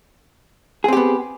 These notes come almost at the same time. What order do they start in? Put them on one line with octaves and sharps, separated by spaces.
G#4 C4 G4 B3